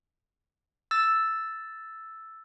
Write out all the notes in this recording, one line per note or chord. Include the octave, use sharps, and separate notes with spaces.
E6 A6